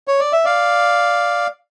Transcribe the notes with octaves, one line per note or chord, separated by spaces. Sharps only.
C#5
D5
E5
D5 F5